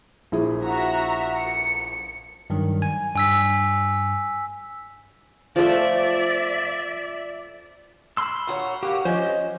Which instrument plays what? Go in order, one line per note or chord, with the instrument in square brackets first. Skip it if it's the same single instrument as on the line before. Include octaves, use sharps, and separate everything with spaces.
[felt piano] A#1 E4 G#4
[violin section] F#4 E5 A#5
C#7
[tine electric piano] G2 D#3 F#3
G#5
[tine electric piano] G2 [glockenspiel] G#5 E6 B6
[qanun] F3 A3 [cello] D5 E5
[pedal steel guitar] B5 C6 E6
[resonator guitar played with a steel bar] A#2 F#4 C#5
[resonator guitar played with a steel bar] A#3 F#4 [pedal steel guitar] G4
[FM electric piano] F3 [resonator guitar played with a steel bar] C#4 [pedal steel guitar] C5 D#5